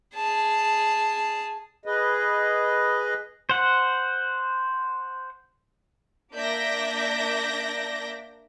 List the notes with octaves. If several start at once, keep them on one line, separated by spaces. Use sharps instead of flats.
G#4 A5
G#4 B4 D#5
C5 F#5
A#3 D4 D5 E5 G6 A#6